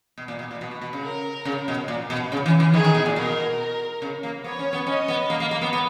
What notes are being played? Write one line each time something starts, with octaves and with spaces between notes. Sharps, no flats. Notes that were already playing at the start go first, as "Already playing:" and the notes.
B2
A#2
B2
A#2
B2
B2
B2
C#3
A#4
C#3
B2
A#2
B2
C#3
E3
E3
D#3 G#4
D#3
B2
A#2
B2 A#4
C#3
A#3
B3 C#5
C#4
B3
C#4 D#5
B3
A#3
A#3
A#3
B3
B3